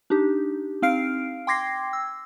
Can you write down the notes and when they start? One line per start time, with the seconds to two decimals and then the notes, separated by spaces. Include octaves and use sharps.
0.10 D4 D#4 G4
0.82 C4 D#4 F5 F6 C7 D7
1.47 G5 C6 D6 G#6 A#6 C7
1.93 E6